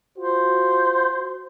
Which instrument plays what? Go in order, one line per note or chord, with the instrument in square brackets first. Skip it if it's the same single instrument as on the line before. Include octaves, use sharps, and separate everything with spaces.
[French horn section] F4 F#4 [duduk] C5